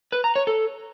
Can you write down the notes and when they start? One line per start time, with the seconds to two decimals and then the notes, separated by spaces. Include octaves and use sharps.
0.12 B4
0.24 A#5
0.36 C#5
0.47 A4